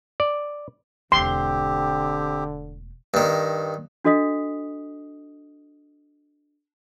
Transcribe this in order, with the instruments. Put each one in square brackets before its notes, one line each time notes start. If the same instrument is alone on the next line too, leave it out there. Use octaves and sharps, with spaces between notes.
[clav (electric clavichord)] D5
[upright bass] E1 A3 [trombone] D3 [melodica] C4 G4 [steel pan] C6
[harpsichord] G2 D#3
[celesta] D4 F#4 A4 D#5 D#6 B6